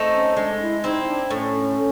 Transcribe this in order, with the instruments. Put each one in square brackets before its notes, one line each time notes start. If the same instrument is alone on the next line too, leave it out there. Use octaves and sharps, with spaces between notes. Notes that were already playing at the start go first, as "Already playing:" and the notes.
Already playing: [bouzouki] A3 C4 D#4
[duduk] C#4
[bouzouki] G#3 [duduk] D4
[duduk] E4
[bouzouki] C4 E4 [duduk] D#4
[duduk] D4
[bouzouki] A2 [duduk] C#4